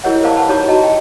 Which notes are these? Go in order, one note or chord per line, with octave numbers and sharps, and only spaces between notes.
E4 G4 A#4 C#5 D#5 F#5
A#4 C5 D5 F5 A5 D6
B4 F#5 A5 B5
D#4 G4 C#5 A#5 D6
D#4 F#4 C#5 D#5 A5 A#5
D#5 G5